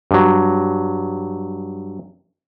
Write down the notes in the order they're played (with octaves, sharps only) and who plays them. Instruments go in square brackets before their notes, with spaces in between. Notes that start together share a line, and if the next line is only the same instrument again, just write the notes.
[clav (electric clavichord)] G2 F#3